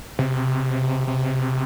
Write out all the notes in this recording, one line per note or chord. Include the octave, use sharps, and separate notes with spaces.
C3
C3